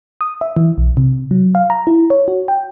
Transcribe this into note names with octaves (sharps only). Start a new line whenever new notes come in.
D#6
E5
E3
B1
C3
F#3
F5
A#5
E4
C#5
F#4
G5